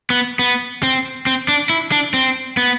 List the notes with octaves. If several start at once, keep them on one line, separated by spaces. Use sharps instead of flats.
B3
B3
C4
C4
D4
E4
D4
C4
B3